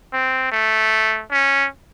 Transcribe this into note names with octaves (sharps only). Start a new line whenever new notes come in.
C4
A3
C#4